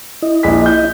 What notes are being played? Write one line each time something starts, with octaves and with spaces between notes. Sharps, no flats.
E4 D#5
A#1 B6
G6